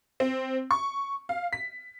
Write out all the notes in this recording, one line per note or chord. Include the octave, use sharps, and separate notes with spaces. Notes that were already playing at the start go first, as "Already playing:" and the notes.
C4
C#6
F5
B6